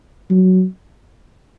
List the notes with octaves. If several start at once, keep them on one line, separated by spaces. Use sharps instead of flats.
F#3